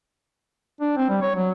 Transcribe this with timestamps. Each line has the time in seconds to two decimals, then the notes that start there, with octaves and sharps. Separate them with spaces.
0.81 D4
0.97 C4
1.09 G3
1.22 C#5
1.36 F#3